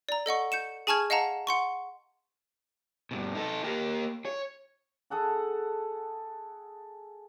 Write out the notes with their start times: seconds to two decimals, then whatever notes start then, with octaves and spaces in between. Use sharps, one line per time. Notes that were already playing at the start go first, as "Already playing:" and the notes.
0.09 D5 A#5
0.26 A4 D#5 F#5 C#6
0.52 G6 C#7 E7
0.87 G#4 G#5 A5 C#6 F6 G#6
1.10 D#5 F5 F#5 A5 A#5
1.47 F#5 C6 C#6
3.11 G2 B2
3.35 D#4 A4
3.64 A#3 G4
4.25 C#5
5.10 G#4 A4 F#5 A5